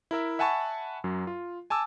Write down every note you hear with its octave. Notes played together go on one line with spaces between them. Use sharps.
E4 A#4 E5
E5 F#5 G#5 A5 B5 C#6
F#2 F#3
F4
G#5 A5 D6 E6